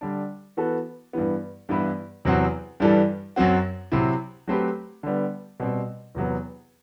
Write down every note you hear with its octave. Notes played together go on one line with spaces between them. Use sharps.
D3 G3 D4
E3 B3 F#4 A4
G2 E3 B3
G2 E3 B3 E4 B4
E2 C3 F#3 C4 F#4
G2 E3 G3 D4 A4
F#2 F#3 C4 F#4
C3 F#3 C4 E4
F#3 A3 C4 G4 B4
D3 G3 B3
B2 G3 C4
E2 C3 F#3 B3